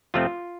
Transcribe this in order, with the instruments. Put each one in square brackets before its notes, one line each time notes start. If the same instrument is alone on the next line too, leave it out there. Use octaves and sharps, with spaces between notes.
[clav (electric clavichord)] F2 C3 F3 A3 C4 F4